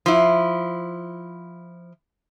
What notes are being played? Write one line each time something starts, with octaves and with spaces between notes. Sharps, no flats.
F3 E4